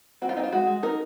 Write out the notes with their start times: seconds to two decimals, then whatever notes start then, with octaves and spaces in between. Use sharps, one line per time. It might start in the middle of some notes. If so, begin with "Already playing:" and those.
0.22 C4 F#4
0.29 F4
0.36 C4 D#4
0.43 F4
0.52 G#3 F#4
0.67 G#3
0.83 D#4 A#4